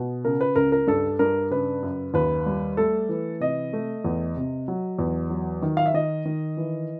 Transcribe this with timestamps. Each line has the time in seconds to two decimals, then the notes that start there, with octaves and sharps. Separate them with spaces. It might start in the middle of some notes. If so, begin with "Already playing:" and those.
Already playing: B2
0.25 C#3 A#4
0.41 B4
0.56 C#2 A#4
0.72 A#4
0.87 G2 A4
1.19 G2 A#4
1.50 C#3 B4
1.83 F#2
2.14 D#2 B4
2.46 G3
2.77 A3 A4
3.09 E3
3.40 C3 D#5
3.73 A3
4.04 E2
4.36 C3
4.68 F#3
4.99 E2
5.30 F#3
5.62 D#3
5.77 F5
5.86 E5
5.94 D#3 D#5
6.25 D#3
6.57 E3